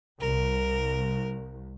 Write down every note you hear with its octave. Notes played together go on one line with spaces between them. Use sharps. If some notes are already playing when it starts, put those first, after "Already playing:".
C2 A#4